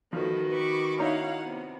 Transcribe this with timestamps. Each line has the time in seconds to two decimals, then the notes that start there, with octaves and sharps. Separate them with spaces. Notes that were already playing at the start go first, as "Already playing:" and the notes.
0.13 D#3 F3 A3 F#4 B4
0.51 B4 B5 C#6 D6
0.98 C#4 D#4 E4 C#5 F5 F#5
1.43 C3 B3